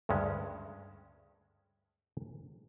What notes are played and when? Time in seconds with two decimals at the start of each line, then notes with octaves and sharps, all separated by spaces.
0.09 D2 G2 C#3 G#3 C#4